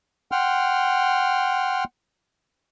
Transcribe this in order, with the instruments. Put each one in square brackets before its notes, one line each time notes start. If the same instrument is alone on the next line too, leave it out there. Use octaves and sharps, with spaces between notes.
[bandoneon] F#5 G5 C6 F6